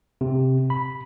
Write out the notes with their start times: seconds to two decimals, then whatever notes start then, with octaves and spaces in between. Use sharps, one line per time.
0.21 C3
0.70 B5